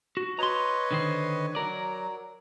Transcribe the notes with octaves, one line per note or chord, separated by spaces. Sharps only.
F#4
B4 C#5 D#5 A#5 C6
D3 D#3 C5
F#3 A#4 D5